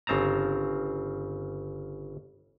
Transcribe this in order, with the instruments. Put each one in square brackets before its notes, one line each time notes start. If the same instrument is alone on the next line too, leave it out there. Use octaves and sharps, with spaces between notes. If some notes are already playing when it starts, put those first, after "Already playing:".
[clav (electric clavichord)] G1 C#3 C4 A5 A#5